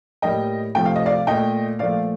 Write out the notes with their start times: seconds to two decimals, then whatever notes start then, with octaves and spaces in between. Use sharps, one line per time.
0.22 A2 G3 A#3 D#5 G5
0.75 C3 F3 A3 G5
0.85 F5
0.96 D#5
1.06 D5 F5
1.27 A#2 A3 D#5 G5
1.79 A#2 F3 A3 D5 F5